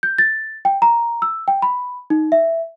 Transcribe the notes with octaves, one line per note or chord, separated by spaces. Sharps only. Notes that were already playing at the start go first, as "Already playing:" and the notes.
G6
A6
G5
A#5
E6
G5
B5
D#4
E5